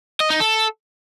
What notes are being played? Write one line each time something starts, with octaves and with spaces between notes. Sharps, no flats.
D#5
D#4
A4